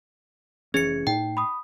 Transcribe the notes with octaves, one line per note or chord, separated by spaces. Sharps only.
F1 E3 C#4 G#4 G#6 C#7
A2 D#4 G5
B5 D#6